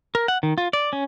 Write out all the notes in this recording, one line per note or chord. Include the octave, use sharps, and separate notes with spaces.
A#4
F#5
D#3
F4
D5
C#4